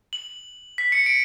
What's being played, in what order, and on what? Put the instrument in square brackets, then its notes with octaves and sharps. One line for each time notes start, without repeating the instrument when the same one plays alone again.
[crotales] F#7
B6
C#7
D7